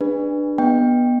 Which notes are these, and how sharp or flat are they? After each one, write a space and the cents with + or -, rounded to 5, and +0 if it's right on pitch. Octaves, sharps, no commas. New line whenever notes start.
D4 +15 G#4 -35 B4 +0
B3 -15 D#5 -15 G5 +10